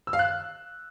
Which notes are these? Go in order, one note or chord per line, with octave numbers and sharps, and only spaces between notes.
E6
F5
F#6